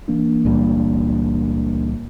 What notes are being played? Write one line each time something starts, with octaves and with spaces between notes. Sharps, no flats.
E3 A#3 D4
C#2 A#2 G3